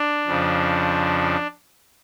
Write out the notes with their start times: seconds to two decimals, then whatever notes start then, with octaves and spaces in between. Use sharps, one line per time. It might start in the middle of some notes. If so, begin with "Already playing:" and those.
Already playing: D4
0.27 F2 C#3 F3